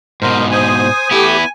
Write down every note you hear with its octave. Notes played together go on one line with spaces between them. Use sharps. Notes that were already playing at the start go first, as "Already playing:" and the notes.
G#2 B2 A#4 C5
C5 G#5 D#6
A3 B3 E4 G4